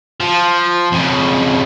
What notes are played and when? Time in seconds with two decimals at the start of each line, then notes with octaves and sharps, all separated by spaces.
0.20 F3
0.92 F2 C#3